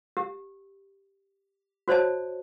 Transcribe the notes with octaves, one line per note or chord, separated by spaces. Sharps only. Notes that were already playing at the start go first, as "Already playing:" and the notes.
G4
F#4 C5 C#5 D#5 A5